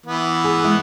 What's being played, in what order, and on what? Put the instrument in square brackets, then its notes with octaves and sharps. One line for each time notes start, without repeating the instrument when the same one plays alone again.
[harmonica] E3 B3
[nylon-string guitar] G#4
G#3 E4 B4